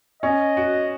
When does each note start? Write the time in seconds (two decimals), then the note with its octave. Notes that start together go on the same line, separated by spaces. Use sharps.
0.23 C#4 D#5
0.57 F#4